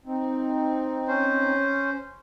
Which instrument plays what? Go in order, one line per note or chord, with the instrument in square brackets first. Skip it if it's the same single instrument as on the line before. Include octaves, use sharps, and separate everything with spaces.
[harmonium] C4 D#4
[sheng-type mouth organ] C#4 C5